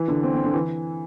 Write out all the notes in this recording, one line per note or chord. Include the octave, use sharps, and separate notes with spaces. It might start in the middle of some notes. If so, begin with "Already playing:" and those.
Already playing: E3
D3
C4
C4
D3
E3